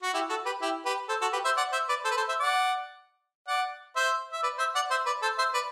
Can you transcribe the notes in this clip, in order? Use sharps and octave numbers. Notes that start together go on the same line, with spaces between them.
F#4
E4 G4
F#4 A4
G4 B4
E4 G4
G4 B4
A4 C5
F#4 A4
G4 B4
C5 E5
D5 F#5
C5 E5
B4 D5
A4 C5
B4
A4 C5
C5 E5
D5 F#5
D5 F#5
C5 E5
E5
B4 D5
C5 E5
D5 F#5
C5 E5
B4 D5
A4 C5
C5 E5
B4 D5